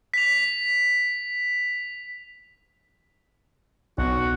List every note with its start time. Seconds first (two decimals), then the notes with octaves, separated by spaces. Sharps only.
0.14 B6 F7
3.98 B1 F#4